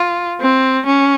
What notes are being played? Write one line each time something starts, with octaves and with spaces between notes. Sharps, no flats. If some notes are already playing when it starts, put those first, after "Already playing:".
Already playing: F4
C4
C#4